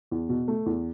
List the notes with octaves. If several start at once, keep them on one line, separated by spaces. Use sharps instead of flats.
E2
B2
A3
E2